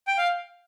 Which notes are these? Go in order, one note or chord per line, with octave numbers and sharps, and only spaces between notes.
G5
F5